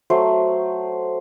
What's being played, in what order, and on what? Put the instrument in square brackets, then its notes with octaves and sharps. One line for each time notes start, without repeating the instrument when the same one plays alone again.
[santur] F#3 A3 C5